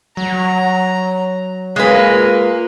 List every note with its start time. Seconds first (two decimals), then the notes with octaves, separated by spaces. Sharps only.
0.17 F#3 A#5
1.76 G#3 A#3 F4 G#4 B4